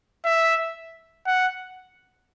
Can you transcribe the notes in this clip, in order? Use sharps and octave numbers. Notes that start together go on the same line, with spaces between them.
E5
F#5